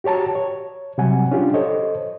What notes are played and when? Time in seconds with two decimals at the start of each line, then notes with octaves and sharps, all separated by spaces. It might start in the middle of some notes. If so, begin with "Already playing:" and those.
0.04 F#4 G4 C#5 A5 A#5
0.35 C#5
0.98 C3 F#3 G3 F#5 G#5
1.31 C#4 D4 F4 G4
1.54 A4 C5 C#5 D#5